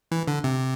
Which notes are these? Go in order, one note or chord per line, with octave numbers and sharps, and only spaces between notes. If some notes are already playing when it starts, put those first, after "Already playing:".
E3
D3
C3